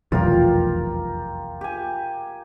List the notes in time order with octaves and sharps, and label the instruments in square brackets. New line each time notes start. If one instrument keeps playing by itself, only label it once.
[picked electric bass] F1 B1 E2 [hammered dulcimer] F4 G4 A#4
[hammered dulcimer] G4 G#5